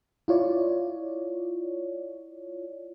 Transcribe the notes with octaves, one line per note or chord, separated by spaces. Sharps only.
E4 F4 C#5 D5